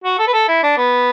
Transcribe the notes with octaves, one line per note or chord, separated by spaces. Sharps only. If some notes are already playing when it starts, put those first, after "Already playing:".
F#4
A4
B4
A4
E4
D4
B3